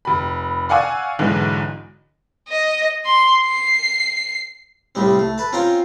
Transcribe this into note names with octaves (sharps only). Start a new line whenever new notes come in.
F1 B5
D5 F5 F#5 G#5 C#6 E6
B1 G#2 D3 E3
D#5
C6
C7
C2 A2 G3 C4
A3
B4 A5
C4 C#4 F4 G5 A#5